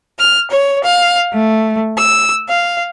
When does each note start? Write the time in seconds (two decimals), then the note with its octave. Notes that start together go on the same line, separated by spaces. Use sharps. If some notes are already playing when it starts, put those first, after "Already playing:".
0.18 F6
0.49 C#5
0.83 F5
1.32 A3
1.95 E6
2.48 F5